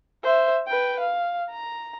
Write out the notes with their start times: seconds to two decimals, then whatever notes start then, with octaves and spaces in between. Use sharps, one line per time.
0.23 C5 E5
0.67 B4 G5
1.00 F5
1.50 A#5